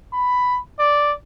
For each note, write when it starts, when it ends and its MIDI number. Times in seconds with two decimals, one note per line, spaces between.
0.13 0.59 83
0.79 1.12 74